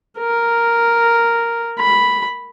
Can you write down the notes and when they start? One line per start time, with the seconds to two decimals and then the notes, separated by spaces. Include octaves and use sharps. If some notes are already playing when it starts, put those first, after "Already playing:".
0.18 A#4
1.79 B5